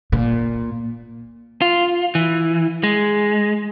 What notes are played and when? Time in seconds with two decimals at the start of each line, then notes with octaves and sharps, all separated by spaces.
0.12 A#2
1.62 F4
2.15 E3
2.83 G#3